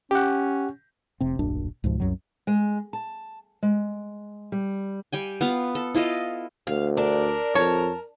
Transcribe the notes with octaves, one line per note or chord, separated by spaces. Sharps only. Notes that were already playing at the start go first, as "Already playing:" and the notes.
C#4 G4 F#5
F1 C3 C4
D1 A#1 F#2 D4
C#2 G#2 B2 F3
C2 F#2 F#3
G#3
A5
G#3
G3
G3 G5 G#5
B3 F4 F5
A4
E4 F4 A4 D#5
D2 F5
D4 A#4
F2 C#5 A5